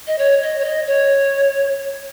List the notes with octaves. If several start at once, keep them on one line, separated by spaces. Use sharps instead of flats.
D#5
C#5
D#5
C#5
D#5
C#5